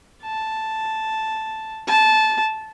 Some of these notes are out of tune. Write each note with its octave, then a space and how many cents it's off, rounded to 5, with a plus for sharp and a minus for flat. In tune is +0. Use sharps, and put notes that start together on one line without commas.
A5 +0
A5 -15